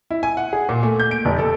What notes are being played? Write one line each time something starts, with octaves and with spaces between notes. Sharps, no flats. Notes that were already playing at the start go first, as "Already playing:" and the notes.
E4
G#5
F#5
G#4
A#2
A3
G6
D7
F1
A4